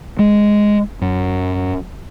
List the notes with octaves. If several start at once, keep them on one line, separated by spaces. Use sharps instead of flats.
G#3
F#2